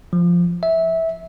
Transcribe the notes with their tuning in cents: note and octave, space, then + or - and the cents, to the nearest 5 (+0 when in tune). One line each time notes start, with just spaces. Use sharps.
F3 +0
E5 -15